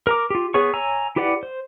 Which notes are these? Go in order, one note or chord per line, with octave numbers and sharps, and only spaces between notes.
A#4 A#5 D6
F4 G4
B3 G#4 B4 C#5 C#6
C#5 G#5 A#5 E6
E4 G4 B4 D5 F#5
C5